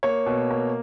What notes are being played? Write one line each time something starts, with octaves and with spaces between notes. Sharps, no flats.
A#3 C#5
B2
A#3